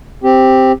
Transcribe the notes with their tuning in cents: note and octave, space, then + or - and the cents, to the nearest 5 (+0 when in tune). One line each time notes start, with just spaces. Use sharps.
C4 +0 G4 +0